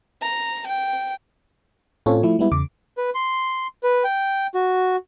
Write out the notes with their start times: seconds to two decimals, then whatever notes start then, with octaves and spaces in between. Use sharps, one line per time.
0.22 A#5
0.67 G5
2.06 A2 C4 C#4 F4 A4 C#5
2.23 F3 A3 E4
2.39 G3 G#3 B3 E4
2.52 E2 C#3 D6
2.97 B4
3.15 C6
3.83 B4
4.04 G5
4.54 F#4